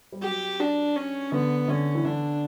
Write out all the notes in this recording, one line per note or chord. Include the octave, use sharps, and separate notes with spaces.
G3
F#3 G4
D4
C#4
D3 B3
D3 C#4
E3
D3 D4